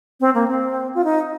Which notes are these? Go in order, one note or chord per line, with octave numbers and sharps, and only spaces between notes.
C4
A#3
C4
F4
D#4